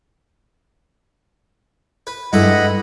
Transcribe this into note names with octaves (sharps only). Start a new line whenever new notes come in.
B4
G2 G#3 E4 A4 D#5 F#5 B5